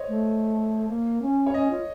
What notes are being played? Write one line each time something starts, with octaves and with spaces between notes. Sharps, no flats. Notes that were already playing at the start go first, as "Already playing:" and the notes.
Already playing: C5 C#5 D#5
A3
A#3
C#4
C#5
C#4 D#5
F4